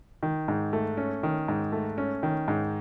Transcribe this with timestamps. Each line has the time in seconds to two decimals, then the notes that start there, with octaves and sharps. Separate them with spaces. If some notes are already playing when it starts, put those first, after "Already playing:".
0.23 D#3
0.48 G#2
0.73 A3
0.97 C#4
1.23 D#3
1.48 G#2
1.72 A3
1.98 C#4
2.23 D#3
2.48 G#2